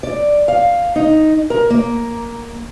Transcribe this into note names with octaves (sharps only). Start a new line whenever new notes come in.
D5
F5
D#4
A#4
A#3